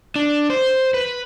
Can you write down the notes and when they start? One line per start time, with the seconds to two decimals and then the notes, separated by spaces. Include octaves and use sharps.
0.16 D4
0.50 C5
0.94 B4